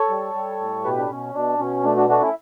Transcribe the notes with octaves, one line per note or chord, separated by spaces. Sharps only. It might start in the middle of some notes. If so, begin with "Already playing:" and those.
Already playing: A4 C#5
G3
G3
A2
B2 G4 B4
D4
B2 C#4
B2 D4
B2 C#4
A3 D4
D4 F#4
A3 D4 F#4
C#4 E4